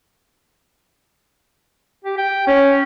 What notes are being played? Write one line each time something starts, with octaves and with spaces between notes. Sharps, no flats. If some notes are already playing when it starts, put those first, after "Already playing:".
G4
G5
C#4